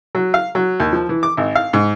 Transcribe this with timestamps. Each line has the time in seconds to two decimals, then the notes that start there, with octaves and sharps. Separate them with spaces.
0.15 F#3
0.34 F5
0.55 F#3
0.80 D#2
0.93 F3
1.09 E3
1.23 D6
1.37 G#1
1.55 F5
1.73 G#2